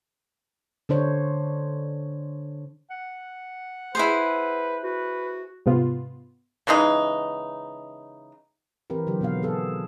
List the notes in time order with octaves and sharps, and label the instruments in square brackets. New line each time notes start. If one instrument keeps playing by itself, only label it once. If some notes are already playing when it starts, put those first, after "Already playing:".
[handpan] D3 D4 C5 C#5
[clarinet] F#5
[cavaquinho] E4 G#4 C5 [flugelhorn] B4
[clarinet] F#4 [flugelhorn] B4
[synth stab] G#2 C3 B3 F4
[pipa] C#3 E3 G#3 D#4
[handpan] E3 C4 G4 A#4 B4
D3 F#3 G4
B2 D#3 B3 F5
B3 G#4 A4 F5